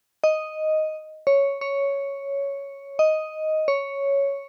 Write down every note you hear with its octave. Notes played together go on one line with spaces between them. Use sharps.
D#5
C#5
C#5
D#5
C#5